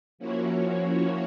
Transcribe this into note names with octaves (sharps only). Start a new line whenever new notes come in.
F3 A#3 C#4 E4 F#4 C#5